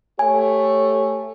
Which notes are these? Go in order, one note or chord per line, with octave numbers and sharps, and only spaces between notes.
A3 G4 C#5 G#5